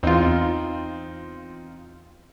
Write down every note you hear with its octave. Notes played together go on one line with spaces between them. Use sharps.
E2 C4 D#4 F4